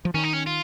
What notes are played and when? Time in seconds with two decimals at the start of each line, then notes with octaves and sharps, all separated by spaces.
0.05 F3
0.14 D#3 C#4
0.23 D#4
0.33 C#4
0.46 F4